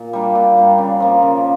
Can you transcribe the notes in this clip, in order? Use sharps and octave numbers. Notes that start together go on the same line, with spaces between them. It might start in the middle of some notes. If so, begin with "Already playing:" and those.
Already playing: A#2
G3 A#3 D4
A#2
G3 A#3 D4
C#3
F3 A#3
C#3